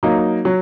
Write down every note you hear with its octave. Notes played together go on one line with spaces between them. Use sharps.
F#3 A#3 D#4
F#3